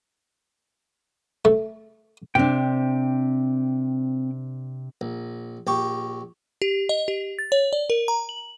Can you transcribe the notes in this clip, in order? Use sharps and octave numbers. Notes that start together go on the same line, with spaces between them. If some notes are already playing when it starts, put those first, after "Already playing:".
A3
C3 C4 D4 G5
A#1
A#1 G4 C#6
G4
D#5
G4
A6
C#5
D5
A#4
A#5
F#7